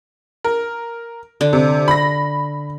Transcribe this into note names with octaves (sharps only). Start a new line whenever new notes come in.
A#4
D3
C3
B5 A#6